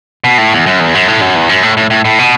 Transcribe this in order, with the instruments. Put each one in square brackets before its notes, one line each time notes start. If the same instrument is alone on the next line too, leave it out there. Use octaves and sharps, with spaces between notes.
[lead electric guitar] B2
A2
E2
F#2
E2
F#2
A2
F#2
E2
F#2
A2
A2
A2
A2
B2